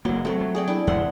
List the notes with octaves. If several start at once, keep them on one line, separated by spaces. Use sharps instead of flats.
F#1 F#3 A#3
F#3 G3 A3 C4
F#3
G#4 D5 G5
D4 E4 G#4
E2 C3 G#3 E5 F#5 C6